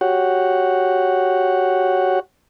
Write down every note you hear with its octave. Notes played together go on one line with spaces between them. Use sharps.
F#4 G4 C#5 F#5